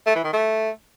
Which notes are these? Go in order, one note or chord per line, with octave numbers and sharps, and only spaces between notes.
A3
E3
D#3
A3